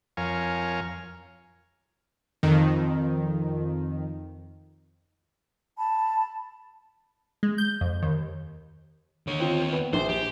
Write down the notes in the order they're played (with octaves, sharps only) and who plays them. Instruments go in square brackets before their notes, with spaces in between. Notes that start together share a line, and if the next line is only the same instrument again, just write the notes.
[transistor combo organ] F2 A#4 C#5 F5 G#5
[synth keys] F2 D#3
[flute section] A5 B5
[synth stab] G#3
G6
F2
D#2
[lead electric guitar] D#2 C#5 [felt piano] D3
[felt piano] C4 F4
B3
[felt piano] A#1 [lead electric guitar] C5
[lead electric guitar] G4